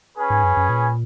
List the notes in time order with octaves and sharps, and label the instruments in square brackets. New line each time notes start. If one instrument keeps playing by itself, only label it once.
[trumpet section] C#4 G#4 B4
[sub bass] G#2
F#2
F#2
A#2